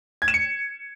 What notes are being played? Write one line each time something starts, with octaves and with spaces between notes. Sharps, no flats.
G#6
E7
C#7